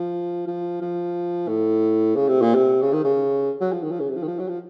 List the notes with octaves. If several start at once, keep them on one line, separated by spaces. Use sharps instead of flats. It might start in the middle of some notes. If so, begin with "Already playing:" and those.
Already playing: F3
F3
F3
A2
C#3
C3
A#2
C3
C#3
D#3
C#3
F#3
F3
D#3
F3
C#3
C3
F3
D#3
F3
F#3
F3